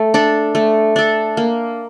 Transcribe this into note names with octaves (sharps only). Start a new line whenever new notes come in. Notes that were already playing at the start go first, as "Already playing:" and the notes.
Already playing: A3
D4 A4
A3
D4 A4
A#3